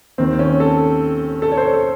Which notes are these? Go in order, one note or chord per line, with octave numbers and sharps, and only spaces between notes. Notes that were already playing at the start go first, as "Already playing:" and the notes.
D#2 D#3 C4
C#4
A4
A4
C#5
C5
A4